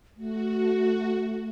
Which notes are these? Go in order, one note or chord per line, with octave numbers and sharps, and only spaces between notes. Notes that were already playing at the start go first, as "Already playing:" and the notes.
A3 F#4